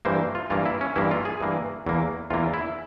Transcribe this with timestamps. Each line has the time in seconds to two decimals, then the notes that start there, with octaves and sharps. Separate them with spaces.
0.05 G2 E3 A#3 C5
0.35 F4
0.50 G2 E3 A#3 F4
0.66 E4
0.81 C#4
0.96 G2 E3 A#3 E4
1.11 F4
1.25 G#4
1.41 G2 E3 A#3
1.86 E2 E3 A#3
2.30 E2 E3 A#3 F4
2.54 E4